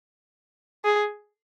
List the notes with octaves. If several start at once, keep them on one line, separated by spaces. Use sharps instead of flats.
G#4